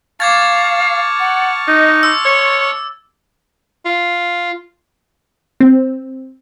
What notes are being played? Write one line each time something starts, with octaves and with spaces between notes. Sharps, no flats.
F5 A5 C#6 D6 F6 G#6 A6
F#5
D#4 D#5
C6 E6
C#5
F4
C4